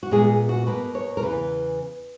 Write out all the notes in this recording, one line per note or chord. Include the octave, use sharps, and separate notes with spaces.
F#4
A#2 G#3 B3 G#4
F#4
B2 A#3 B4
C#5
A#4
E2 C#3 E3 B4